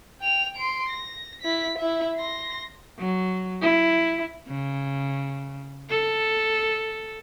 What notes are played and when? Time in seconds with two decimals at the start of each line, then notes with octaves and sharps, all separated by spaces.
0.20 G5 F7
0.57 C6 D7
0.89 A#6
1.42 E4 B6
1.78 E4 E5
2.16 C6 A#6
2.99 F#3
3.62 E4
4.48 C#3
5.90 A4